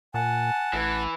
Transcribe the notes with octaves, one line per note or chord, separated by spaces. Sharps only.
A#2 F#5 G#5 A5
A1 E3